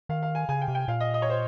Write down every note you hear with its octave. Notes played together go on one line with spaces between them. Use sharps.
D#3 F5
F5
G#5
C#3 G#5
G5
C3
G5
A#2 F5
D#5
D#5
C#5
C5